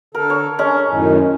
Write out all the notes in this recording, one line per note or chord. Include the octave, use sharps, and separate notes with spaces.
D3 A4 A#4
C#5
G#3 C#4 D4 A#5
F#2 A2 D#3